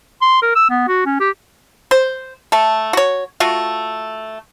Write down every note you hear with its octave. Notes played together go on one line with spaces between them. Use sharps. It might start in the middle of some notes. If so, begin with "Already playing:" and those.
C6
A#4
E6
B3
F#4
C#4
G4
C5
A3 A4
F#4 C#5
A3 F4 F#4